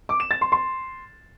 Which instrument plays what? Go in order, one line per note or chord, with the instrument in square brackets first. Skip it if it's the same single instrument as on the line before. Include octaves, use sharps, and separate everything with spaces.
[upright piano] D6
E7
A6
C6
C6